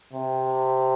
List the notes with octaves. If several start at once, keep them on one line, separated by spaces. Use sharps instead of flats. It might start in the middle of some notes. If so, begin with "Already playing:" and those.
C3